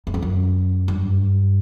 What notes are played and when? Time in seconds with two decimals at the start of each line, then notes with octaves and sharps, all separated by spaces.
0.07 E2
0.14 F2
0.22 F#2
0.88 G2